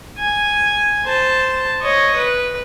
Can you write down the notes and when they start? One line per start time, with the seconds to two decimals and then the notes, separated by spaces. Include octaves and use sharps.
0.18 G#5
1.05 C5 A5
1.82 C#5 D#5
2.16 B4